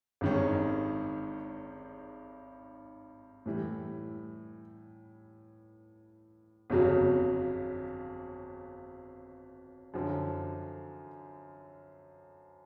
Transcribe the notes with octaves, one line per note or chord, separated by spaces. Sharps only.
G#1 G2 D#3 G#3 C#4
A2 E3 G3
G1 F2 C#3 F#3
F#2 D3 F3